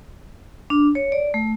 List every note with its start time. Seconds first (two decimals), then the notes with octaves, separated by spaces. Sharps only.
0.70 D4
0.95 C#5
1.12 D5
1.34 A3